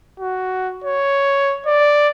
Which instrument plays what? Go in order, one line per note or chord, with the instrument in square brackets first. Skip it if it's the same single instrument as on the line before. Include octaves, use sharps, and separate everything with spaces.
[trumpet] F#4
C#5
D5